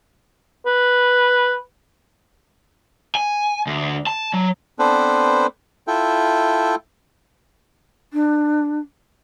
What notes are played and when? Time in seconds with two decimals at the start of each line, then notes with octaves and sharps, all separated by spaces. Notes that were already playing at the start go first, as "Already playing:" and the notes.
0.66 B4
3.15 G#5
3.67 D2
4.07 A5
4.33 F#3
4.79 B3 C4 D4 A4 B4 C5
5.87 E4 F4 A4 E5 G5
8.13 D4